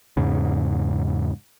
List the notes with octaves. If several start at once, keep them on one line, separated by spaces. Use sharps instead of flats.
E2 G#2 C#3